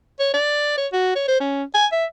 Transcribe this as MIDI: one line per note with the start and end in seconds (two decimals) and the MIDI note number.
0.19 0.31 73
0.34 0.77 74
0.77 0.87 73
0.92 1.13 66
1.15 1.28 73
1.28 1.38 72
1.40 1.63 61
1.74 1.86 80
1.92 2.05 76